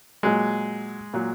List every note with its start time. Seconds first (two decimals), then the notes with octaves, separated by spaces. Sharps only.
0.23 A#2 F#3 G#3
1.14 A#2 F#3